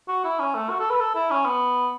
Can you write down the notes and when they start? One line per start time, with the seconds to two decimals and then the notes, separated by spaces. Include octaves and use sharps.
0.08 F#4
0.24 E4
0.39 C#4
0.55 A3
0.70 F#4
0.80 A4
0.90 B4
1.00 A4
1.15 E4
1.31 C#4
1.46 B3